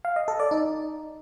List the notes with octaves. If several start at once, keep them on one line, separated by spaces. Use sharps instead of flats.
F5
D#5
A4
D5
D#4